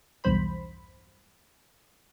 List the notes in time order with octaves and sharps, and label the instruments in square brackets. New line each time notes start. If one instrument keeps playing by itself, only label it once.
[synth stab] B1 E2 G2 C5 B5